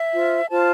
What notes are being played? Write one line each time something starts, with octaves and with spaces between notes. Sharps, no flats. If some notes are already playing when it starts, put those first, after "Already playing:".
Already playing: E5
F4 C5
F4 C5 A5